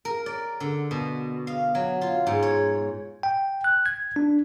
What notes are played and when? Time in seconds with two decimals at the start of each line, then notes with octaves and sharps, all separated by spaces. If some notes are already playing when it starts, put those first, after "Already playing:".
0.05 A#4
0.26 D5
0.60 D3
0.91 B2
1.47 F5
1.75 F#3
2.01 F4
2.27 G#2
2.42 C#5
3.23 G5
3.64 F#6
3.86 G#6
4.16 D4